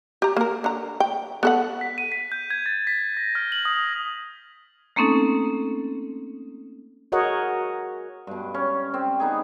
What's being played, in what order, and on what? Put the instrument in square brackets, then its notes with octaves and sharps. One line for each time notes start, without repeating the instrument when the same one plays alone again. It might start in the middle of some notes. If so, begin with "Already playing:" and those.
[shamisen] G4 A#5
A#3 A#4
D3 A#5
G5
B3 A4 F#5
[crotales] B6
D#7
B6
G6
G#6
A6
B6
A#6
F6
F#7
D#6
[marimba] A3 A#3 C4 C#4 D#4 A4
[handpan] F#4 G#4 A#4 C#5 D#5 F#5
[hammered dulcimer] G2 B2
C#4
C4
B3 D#4 G#4